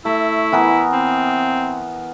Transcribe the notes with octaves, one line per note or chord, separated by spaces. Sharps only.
A3 E4
E3 B3 A#4
C4